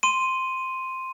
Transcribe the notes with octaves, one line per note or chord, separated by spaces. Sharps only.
C6 D#7